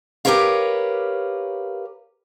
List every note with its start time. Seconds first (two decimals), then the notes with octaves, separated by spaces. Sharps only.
0.25 G4 G#4 A#4 B4 C#5 F5